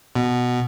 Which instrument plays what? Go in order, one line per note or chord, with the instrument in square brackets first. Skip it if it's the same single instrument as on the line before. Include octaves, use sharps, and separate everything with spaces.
[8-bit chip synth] B2